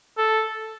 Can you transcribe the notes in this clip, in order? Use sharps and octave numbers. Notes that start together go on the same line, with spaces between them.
A4